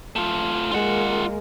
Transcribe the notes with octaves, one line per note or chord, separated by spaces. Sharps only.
A3 F4
G#3 A#3 F4 F#5